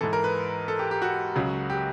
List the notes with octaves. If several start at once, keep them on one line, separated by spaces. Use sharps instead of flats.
G#2 E3 A4
A#4
B4
A4
G4
G4
F#4
C#2 C#3 F#3
G4